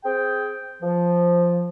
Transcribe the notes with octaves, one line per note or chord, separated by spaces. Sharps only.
C4 G#4 G5
F3